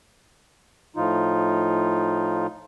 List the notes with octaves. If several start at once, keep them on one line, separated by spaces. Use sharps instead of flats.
A2 F3 D#4 F4